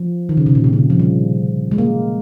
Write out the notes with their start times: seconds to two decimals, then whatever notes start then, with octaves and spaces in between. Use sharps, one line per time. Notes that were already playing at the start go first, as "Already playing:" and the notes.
Already playing: F3
0.29 D#3
0.37 C#3
0.46 C3
0.55 A#2
0.64 C3
0.73 C#3
0.90 F3
0.99 G3
1.71 G#3
1.78 A#3